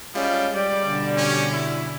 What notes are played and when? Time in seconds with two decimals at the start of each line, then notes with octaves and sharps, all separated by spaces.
0.15 G3 G#3 C#4 F4
0.54 G3 D5
0.86 B2 D3
1.17 C#4
1.52 E4